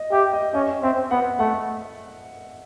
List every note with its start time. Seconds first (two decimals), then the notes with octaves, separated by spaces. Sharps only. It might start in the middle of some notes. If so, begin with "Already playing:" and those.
Already playing: D#5
0.12 G4 E5
0.33 D#5
0.54 C#4 D#5
0.83 C4 E5
1.11 B3 F#5
1.39 A3 F#5